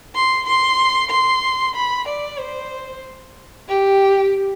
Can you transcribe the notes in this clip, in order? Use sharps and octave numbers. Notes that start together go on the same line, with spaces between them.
C6
C6
C6
B5
D5
C5
G4